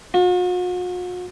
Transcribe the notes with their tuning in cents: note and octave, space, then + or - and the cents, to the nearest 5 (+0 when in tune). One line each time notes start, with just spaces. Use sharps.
F#4 -45